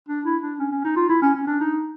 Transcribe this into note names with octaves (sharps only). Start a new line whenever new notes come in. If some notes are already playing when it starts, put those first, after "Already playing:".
D4
E4
D4
C#4
C#4
D#4
F4
E4
C#4
C#4
D4
D#4